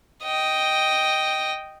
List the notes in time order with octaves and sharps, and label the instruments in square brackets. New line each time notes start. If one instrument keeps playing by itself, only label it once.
[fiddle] D#5 G5